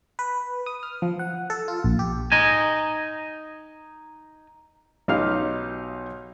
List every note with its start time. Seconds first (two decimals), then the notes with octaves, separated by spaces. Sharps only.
0.19 B4
0.66 D#6
0.83 F6
1.02 F3
1.19 F#5
1.50 A4
1.68 F4
1.84 A#1
1.99 G4
2.32 D#4 D#5 G#5
5.08 B1 D#4 G4 F5 F6